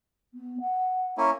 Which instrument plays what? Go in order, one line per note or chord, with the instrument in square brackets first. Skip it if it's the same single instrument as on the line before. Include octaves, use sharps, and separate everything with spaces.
[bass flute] B3
F#5
[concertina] A#3 C#4 E4